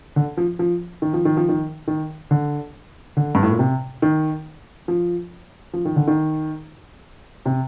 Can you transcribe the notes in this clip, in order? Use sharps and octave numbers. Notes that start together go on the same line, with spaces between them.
D3
F3
F3
D#3
F3
D#3
F3
D#3
D#3
D3
D3
G2
A2
A#2
C3
D#3
F3
F3
D#3
D3
D#3
C3